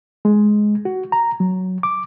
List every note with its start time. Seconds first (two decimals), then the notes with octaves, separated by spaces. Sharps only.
0.25 G#3
0.85 F#4
1.12 A#5
1.40 F#3
1.83 D6